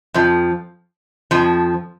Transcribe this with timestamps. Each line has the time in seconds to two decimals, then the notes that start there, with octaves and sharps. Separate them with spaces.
0.14 F2 F3
1.31 F2 F3